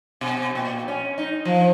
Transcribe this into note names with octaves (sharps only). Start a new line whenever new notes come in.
B2
A#2
C#4
D#4
F3